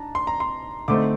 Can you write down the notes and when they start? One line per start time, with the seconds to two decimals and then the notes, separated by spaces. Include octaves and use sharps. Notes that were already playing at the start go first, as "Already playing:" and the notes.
Already playing: D4 A5 A#5
0.15 C6
0.27 A#5
0.40 C6
0.88 D3 A3 C4 D#4 D6